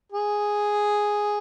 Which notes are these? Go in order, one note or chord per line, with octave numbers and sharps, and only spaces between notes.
G#4